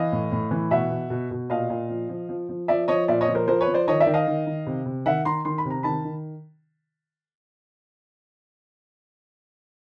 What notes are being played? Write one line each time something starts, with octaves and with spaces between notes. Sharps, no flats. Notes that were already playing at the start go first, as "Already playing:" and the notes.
Already playing: E3 D#5 F5
A2
A2
E3
B2 E5 F#5
B2
B2
B2
A#2 D#5 F5
A#2
F3
F3
F3
F3
F3 D5 E5
F3 C#5 D#5
A#2 D5 E5
C#5 D#5
F3
A#4 C5
F3 A#4 C5
B4 C#5
F3
C5 D5
D#3 C#5 D#5
D5 E5
D#3
D#5 F5
D#3
D#3
C3
C3
D#3 E5 F#5
D#3 A#5 C6
D#3 C6
B5
C3
A#5
D#3 A5 B5
D#3